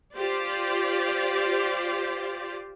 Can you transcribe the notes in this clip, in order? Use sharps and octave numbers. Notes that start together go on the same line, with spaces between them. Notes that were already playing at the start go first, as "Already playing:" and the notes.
F4 G4 C5 D5